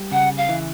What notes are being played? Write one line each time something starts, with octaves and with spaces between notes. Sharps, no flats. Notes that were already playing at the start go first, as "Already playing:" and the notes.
Already playing: G3
C#3 F#5
F5
E3